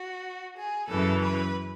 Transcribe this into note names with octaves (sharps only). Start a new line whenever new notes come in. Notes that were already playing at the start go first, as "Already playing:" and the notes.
Already playing: F#4
G#4
F#2 C#3 E3 A4
B4